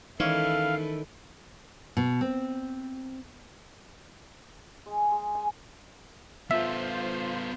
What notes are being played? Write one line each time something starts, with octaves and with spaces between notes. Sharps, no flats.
D#3 E3 G#3 C#4 E4 A4 B4 F5
B2
C4
G#3
G#3
G#5
B3 F4 A4 C5 E5